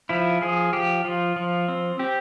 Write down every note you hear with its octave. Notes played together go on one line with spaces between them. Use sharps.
F3 E4
F3 G#4
F3 G4
F3 F4
F3
C4
C4 G4